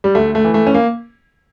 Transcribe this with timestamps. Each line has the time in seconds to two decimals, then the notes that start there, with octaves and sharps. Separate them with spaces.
0.04 G3
0.15 D2 A3
0.35 A3
0.45 E3
0.54 A3
0.67 C#4
0.74 A#3